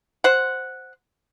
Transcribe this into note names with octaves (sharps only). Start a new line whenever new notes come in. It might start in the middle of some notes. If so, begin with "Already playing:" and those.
C5 F#5